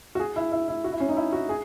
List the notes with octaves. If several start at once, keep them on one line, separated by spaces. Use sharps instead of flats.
F#4
G#4
E4
E4
E4
F#4
E4
C#4
D#4
E4
F#4
G#4